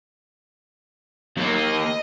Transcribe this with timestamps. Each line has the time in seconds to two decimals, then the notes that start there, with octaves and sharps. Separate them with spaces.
1.37 D#2 F#3 A#3
1.57 D#5